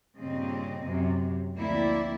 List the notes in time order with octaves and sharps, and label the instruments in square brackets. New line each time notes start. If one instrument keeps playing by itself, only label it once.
[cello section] G2 A#2 C#3 C4 D#5
F#2 C3 C4
D2 F3 A#3 C4 E4 D5